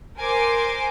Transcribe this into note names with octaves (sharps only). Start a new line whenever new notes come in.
A#4 C5 G#5 C6 D6